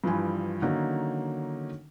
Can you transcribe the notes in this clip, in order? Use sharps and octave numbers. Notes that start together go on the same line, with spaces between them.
G2 E3 F3 G3 G#5 C6
D3 D#3 F#3 A#3 C#4 D#4